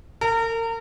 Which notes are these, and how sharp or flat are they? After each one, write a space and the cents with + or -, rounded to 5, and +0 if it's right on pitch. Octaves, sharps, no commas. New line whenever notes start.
A#4 -35